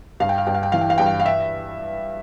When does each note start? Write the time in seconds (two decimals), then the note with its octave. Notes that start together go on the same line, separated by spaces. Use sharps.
0.20 G2 F5
0.29 G5
0.38 F5
0.47 G2 G5
0.54 F5
0.63 G5
0.72 E3 F5
0.81 G5
0.90 F5
0.98 G2 G5
1.06 F5
1.20 F5
1.26 E5